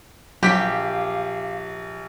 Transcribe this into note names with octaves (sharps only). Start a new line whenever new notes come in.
A#1 F#3 G4 F5 B6